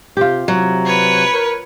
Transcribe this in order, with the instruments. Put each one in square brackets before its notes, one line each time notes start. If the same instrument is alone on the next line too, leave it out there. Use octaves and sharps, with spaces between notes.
[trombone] C3 [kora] F4 G4
[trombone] C3 [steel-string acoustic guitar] F#3
[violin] B4 C#5
[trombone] A#4